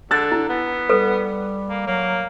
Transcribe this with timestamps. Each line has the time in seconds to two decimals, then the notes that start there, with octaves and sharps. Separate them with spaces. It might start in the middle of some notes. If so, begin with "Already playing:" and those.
0.11 D3 E6 F#6 A6
0.32 E4
0.49 B3
0.89 G3 A4 B4
1.70 A#3
1.87 F#3 A#3